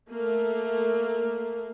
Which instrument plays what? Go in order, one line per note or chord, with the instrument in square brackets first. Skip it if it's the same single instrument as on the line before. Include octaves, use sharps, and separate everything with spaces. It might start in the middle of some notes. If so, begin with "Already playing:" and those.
[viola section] A3 A#3